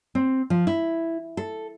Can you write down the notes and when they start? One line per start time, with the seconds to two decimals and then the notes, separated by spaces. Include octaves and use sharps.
0.15 C4
0.50 F3
0.67 E4
1.37 A4